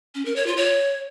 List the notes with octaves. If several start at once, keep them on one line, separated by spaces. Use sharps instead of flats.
C#4
A#4
C#5
F4
C#5